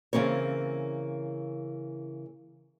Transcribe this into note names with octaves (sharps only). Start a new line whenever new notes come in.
C#3 E3 A#3 C4 C#5